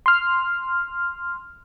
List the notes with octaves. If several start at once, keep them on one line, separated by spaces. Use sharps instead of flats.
C6 F6